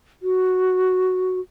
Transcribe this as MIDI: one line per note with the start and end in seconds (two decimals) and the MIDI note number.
0.23 1.40 66